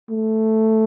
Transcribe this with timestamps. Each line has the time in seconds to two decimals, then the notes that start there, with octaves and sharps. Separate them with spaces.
0.10 A3